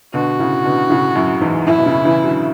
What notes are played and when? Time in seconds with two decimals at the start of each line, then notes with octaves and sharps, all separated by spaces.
0.14 B2 D3 F#4
0.39 A2 C#3
0.65 B2 D3
0.90 A2 C#3
1.15 F#2 A2
1.41 E2 G#2
1.66 F#2 A2 E4
1.78 B2
1.86 A2 C#3
2.05 C#3 E3
2.24 D3 F#3